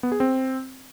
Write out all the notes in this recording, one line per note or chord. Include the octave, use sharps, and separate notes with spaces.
B3
G#4
C4